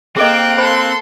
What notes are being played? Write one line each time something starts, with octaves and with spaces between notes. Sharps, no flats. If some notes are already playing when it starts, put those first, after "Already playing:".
A#3 C4 G#4 A4 D#5 G5 F#6 D7
A4 C5 B5 C6